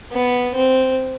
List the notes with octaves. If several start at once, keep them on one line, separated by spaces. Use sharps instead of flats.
B3
C4